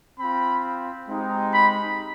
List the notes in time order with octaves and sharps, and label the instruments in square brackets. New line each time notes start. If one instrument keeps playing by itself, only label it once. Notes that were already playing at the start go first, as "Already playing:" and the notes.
[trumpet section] C4 F4 B5
G#3 C4 D#4 G4
B5